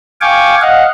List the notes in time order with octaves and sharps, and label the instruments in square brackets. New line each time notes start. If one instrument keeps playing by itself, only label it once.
[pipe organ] F5 G5 G#5 C#6 D6
D#5 F5 F#5